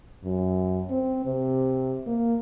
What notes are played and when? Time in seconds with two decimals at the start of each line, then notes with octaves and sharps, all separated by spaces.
0.24 F#2
0.90 C4
1.25 C3
2.07 A#3